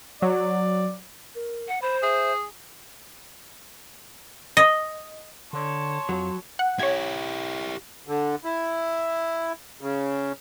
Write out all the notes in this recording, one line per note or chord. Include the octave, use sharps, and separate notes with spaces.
F#3 D5
A#4
F#5
C5 B5
G#4 E5
D#5
D3 C#5 A5 C6
F2 F#3
F#5
E4 G4 C#5 G#6
D3
E4
C#3